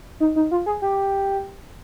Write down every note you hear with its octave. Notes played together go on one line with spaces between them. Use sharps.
D#4
D#4
F4
G#4
G4